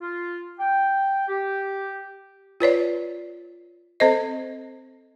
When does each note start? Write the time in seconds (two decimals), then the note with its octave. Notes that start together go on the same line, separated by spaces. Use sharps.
0.01 F4
0.59 G5
1.28 G4
2.60 F4 B4 C#5 D5
4.00 C4 A4 C5 D#5